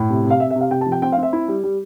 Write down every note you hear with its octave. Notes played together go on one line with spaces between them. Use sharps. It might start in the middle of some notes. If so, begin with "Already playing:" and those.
Already playing: A2
C3
C3
F5
C3 E5
E5
C3
F5
C3 G5
A5
F3
G5
C4 G5
F5
C4
E5
E4
G3
G3